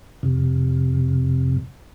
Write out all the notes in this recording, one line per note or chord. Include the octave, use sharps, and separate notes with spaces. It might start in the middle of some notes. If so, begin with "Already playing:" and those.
F2 C3